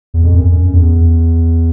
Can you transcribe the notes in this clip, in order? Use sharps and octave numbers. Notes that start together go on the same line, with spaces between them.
E2
F2
F#2
E2